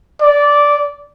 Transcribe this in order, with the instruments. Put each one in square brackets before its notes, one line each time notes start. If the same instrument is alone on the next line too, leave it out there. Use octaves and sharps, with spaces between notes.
[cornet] D5